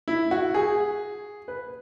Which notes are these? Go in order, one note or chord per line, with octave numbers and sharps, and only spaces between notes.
E4
F#4
G#4
B4